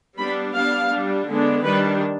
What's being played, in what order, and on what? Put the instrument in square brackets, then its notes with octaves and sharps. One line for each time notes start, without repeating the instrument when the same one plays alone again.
[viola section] G3 B3 D4 B5
G3 B3 D4 F5
G3 D4
D3 G#3 B3 D4
D#3 G3 D4 B4